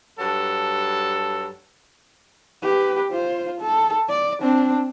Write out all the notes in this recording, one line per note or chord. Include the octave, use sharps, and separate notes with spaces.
G2 F#3 A4
G4 B4
F4 C5
A4
D5
C4 D4